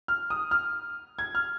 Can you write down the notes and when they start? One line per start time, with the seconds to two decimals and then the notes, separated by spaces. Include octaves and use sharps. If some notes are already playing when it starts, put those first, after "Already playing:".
0.08 F6
0.30 D#6
0.51 F6
1.19 G#6
1.35 F6